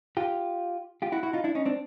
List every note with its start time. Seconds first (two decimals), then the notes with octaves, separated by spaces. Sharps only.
0.17 F4 G4
1.02 F4 G4
1.12 E4 F#4
1.23 E4 F#4
1.33 D#4 F4
1.44 D4 E4
1.55 C#4 D#4
1.65 C4 D4